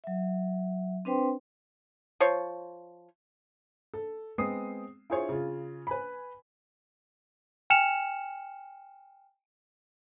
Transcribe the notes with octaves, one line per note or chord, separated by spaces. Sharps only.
F#3 E5
C4 D4 B4 C5 G5 C6
F3 C5 C#5
A4
G#3 B3 C4 D#6 C7
E4 F4 G#4 C5 C#5
C#3 F4
B4 G#5 B5
G5 G#5 F6 C#7 E7 F7